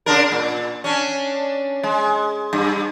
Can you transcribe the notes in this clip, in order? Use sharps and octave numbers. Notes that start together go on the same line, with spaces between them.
C#3 D4 A#4
A#2
C#4 D4
G#3
G2